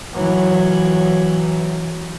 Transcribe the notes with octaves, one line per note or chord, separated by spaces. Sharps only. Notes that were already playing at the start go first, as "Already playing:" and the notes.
E3 F#3